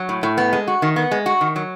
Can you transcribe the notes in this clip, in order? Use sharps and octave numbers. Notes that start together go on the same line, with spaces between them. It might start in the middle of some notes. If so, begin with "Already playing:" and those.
Already playing: F#3
A2
A2
B3
G#3
F#4
D#3
B3
G#3
F#4
D#3
F#3